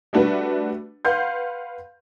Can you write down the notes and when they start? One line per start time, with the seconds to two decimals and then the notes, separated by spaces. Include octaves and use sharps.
0.13 G3 A3 D4 F#4 B4
1.05 B4 F5 F#5 C6 G6